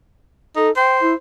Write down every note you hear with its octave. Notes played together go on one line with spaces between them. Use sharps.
D#4 A4
C5 G5
E4